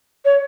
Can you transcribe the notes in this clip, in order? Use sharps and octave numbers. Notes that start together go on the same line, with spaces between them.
C#5